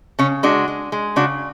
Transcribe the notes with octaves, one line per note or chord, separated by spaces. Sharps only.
C#3 C#4
G#3 D4 F#4
G#3
G#3
C#3 D4 F#4